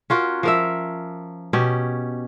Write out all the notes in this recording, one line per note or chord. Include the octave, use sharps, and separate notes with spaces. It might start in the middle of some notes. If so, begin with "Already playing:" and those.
C#4 F4 F#4 A#4
F3 A#4 E5
B2 C#4 G4